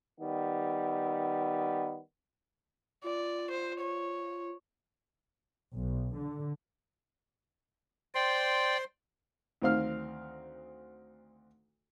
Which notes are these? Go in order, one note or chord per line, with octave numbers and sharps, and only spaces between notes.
D#3 G3 B3
F4 D5
C5
C#5
B1
D3
C5 D5 G5 C6
D2 D#3 C4 F5 F6